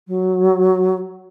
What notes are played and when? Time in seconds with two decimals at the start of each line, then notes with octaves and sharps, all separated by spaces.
0.07 F#3